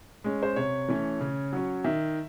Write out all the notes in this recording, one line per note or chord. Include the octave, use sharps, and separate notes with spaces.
G#3 C#4
C5
C3 C#5
E3 A3 C#4
C#3
F#3 C#4
D#3 E5